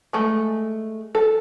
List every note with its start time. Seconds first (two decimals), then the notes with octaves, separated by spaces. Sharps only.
0.13 G#3 A3
1.15 A4